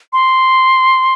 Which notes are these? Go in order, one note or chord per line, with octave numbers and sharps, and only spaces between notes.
C6